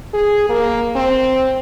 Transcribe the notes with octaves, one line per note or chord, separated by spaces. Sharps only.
G#4
A#3
C4